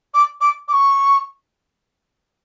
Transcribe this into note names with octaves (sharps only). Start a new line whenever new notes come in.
D6
D6
D6
C#6